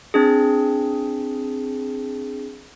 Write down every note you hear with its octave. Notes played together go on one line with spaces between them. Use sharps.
C4 D4 G#4